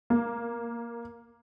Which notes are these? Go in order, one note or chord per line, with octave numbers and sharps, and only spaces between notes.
A#3